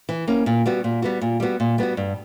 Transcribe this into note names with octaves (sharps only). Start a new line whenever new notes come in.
E3
A#3 C#4
A#2
G3 B3 F#4
A#2
G3 B3 F#4
A#2
G3 B3 F#4
A#2
G3 B3 F#4
G2